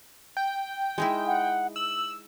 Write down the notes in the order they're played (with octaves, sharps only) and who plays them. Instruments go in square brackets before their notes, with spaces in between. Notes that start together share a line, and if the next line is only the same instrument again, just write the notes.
[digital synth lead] G5
[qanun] G#3 D#4 E4
[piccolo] F#5
[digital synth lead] E6 [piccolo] F#7